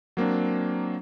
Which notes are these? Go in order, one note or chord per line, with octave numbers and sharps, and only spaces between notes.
F#3 A#3 C4 D4